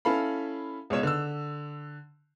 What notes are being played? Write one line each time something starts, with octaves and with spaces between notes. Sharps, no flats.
C#4 E4 A4 F5 B5
C#2 B2 C#5 E7
D3 E6